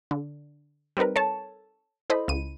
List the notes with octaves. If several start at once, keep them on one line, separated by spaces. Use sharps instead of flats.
D3
G3 C4 D#4 A#4 B4
A4 C#5 A5
E4 A4 C5 D#5 B5
C#2 D#7